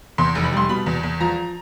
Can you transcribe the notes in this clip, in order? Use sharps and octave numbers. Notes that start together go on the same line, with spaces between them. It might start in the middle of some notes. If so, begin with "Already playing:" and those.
E2 C6
F1
B5
G3 C6
B2 B5
E2
E2
F3 A#5